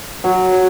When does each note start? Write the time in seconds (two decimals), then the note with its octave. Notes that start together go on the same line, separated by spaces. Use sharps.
0.24 F#3
0.52 F#3